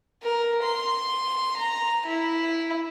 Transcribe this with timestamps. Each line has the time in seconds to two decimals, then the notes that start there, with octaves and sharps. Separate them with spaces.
0.23 A#4
0.63 C6
1.57 A#5
2.06 E4